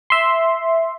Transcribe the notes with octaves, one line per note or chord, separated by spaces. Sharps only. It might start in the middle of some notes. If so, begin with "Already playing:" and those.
E5 C6